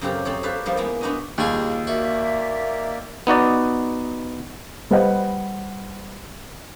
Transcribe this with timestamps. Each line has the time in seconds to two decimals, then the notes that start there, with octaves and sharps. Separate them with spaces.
0.01 F#2 C#3 C4 G4 A4 A#5
0.25 C4 D#4 A4 C#5
0.43 G4 A4 B4 E5 F5
0.65 F3 G3 A#3 D#4
0.77 G#3 A#3 B3 E4
1.01 B3 D4 D#4 F#4 D#5
1.38 D#2 G3 A#3 F4 G#4
1.87 A#3 F#4 A#4 D5 E5
3.27 B3 D#4 F#4 D5
4.91 G3 B4 C5 D#5 F#5